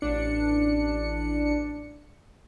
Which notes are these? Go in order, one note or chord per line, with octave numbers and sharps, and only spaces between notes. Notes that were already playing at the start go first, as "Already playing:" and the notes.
A1 D4 C#7